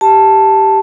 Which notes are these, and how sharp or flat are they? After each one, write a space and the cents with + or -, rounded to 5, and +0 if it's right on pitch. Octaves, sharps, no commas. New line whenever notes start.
G4 +0 A5 +0